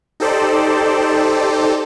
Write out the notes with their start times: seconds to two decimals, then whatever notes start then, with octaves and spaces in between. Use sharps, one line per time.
0.20 D#4 G4 A4 C5 D5